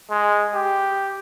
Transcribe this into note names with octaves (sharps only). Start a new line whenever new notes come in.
G#3
G4